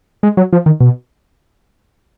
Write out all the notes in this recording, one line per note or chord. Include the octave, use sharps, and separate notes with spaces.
G#3
F#3
F3
D#3
B2